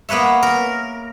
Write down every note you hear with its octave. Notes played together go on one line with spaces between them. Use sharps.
A#3 B3 B4 C#5 E5
A#4